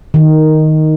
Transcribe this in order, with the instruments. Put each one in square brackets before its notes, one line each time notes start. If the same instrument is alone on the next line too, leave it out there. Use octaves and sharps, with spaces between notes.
[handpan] D#3